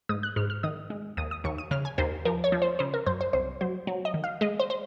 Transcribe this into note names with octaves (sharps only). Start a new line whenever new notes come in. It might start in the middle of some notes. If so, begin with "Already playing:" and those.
G#2 D#6
F#6
G#2 F6
F6
D#3 D#6
G#3
D#2 D#6
D#6
D#2 C#6
D#6
C#3 F6
G#5
D#2 C5
F3 A#4
C#5
F3
C5
C#3 C5
A#4
F#2 C5
C5
C2 C5
F#3 C5
F#3
D#5
D#3
F5
G#3 D#5
C5
C5